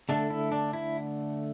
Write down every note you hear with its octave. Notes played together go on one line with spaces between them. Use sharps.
D3 A3 D4
E4
D4
E4